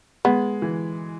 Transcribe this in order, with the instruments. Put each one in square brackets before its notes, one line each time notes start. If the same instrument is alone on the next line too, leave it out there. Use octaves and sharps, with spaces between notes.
[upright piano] G#3 [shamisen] B3
[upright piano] E3